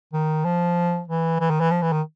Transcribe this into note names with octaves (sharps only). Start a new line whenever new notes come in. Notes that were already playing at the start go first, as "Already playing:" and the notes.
D#3
F3
E3
E3
D#3
E3
F3
E3
D#3